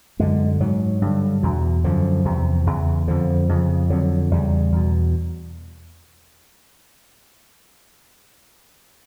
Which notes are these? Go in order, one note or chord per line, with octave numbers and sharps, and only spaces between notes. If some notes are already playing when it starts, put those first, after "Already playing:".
F#2 D3 G#3
G#2 F#3
G2 D3
E2 B2
F#2 D3 F3
E2 C3
E2 C#3
F2 D3 F3
F2 C#3
F2 D3 F#3
E2 C#3 G3
E2 B2